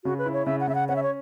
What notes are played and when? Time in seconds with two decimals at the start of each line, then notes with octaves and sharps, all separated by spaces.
0.04 C#3 F#4
0.18 B4
0.26 E4
0.33 C#5
0.46 C#3 E5
0.60 F#5
0.67 C#3 E5
0.75 F#5
0.89 C#4 F#5
0.96 E5
1.03 C#5